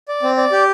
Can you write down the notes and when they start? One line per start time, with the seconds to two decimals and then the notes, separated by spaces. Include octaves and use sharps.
0.08 D5
0.23 C4
0.37 D5
0.52 G4